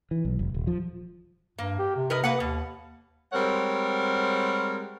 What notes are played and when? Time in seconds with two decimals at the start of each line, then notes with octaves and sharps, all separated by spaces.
0.11 E3
0.25 B1
0.39 F1
0.54 D#1
0.67 F3
1.58 G2 A#3
1.79 G4
1.96 C3
2.10 A#4 B4 D#5
2.24 A#3 B4 F#5
2.40 D#2 B2
3.32 G3 G#3 C4 A#4 C#5 F#5